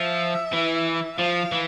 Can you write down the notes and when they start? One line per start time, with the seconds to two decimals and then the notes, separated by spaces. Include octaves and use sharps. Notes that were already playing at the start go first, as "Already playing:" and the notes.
Already playing: F3 E5
0.53 E3
1.19 F3 F5
1.52 E3